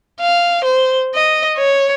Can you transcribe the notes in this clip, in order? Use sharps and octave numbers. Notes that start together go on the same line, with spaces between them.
F5
C5
D#5
C#5